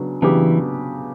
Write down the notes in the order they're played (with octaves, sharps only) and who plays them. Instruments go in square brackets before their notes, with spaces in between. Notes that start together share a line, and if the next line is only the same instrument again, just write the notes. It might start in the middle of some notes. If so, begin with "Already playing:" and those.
Already playing: [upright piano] C#3 F#3 B3 D4
[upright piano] C#3 F#3 B3 D4 G4 [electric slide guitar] E3